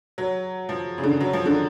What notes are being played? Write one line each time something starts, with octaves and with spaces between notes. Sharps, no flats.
F#3
F3
C#3
D3
F#3
F3
D3